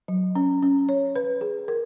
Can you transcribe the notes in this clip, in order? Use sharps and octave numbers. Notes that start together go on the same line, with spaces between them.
F#3
C#4
C#4
C#5
B4
G#4
A#4